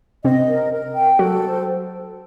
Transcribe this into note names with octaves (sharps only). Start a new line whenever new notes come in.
C3 C4 D#5
A#4
A#4
G5
F#3 F#4 A4
C5